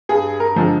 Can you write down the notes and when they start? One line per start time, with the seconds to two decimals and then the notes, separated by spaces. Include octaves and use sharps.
0.09 G2 G#4
0.40 A#4
0.56 D3 F3 G#3